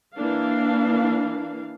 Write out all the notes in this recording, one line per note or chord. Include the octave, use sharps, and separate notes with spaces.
E3 A#3 D4 F5